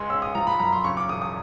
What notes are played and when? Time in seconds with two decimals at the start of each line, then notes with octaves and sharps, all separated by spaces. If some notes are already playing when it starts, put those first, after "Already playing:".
Already playing: C#2 G#3 C6
0.10 C#4 E6
0.22 D#6
0.35 F3 A#5
0.47 B5
0.59 F#2 A#5
0.72 C6
0.84 C#3 C#6
0.97 D6
1.09 E1 D#6
1.22 D#6